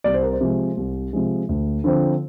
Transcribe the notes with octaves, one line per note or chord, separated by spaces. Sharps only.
C2 D5
C5
A#4
C5
C3 F3 G#3
C2
C3 F3 G#3
D2
D3 F3 C4